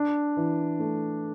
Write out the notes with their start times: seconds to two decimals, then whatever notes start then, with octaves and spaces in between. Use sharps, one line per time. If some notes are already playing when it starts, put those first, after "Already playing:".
Already playing: D4
0.37 E3
0.80 A3